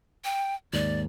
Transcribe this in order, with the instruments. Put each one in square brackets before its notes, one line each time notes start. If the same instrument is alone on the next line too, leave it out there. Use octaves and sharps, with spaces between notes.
[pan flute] G5
[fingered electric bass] D#2 G#2 [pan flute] D5